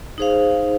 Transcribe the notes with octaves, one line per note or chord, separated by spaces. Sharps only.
D#4 G#4 C5 F5